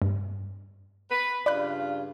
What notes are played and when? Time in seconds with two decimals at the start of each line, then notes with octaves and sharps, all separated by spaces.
0.02 G2
1.10 B4
1.46 G2 C#3 F4 D5 B5 F#6